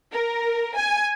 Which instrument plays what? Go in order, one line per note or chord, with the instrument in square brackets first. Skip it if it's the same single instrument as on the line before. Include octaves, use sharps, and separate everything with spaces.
[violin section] A#4
G#5